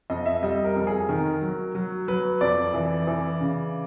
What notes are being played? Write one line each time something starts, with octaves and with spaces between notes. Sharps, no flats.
F2 D#5
E5
G3 D#5
A#4
F2
G#4
D#3 A#4
F#3
F#3
F#3 B4
F2 D5
E3
E3
C#3